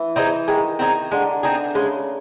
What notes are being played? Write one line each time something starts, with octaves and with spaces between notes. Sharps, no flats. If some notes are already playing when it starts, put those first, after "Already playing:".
Already playing: E3
C4 D#4 G#4
D#3 G#3
C4 D#4 G#4
D3 G#3
C4 D#4 G#4
C#3 G#3